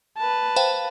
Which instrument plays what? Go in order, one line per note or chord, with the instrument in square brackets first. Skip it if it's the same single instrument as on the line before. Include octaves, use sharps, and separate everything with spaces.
[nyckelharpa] B4 A5
[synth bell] C5 F5 G5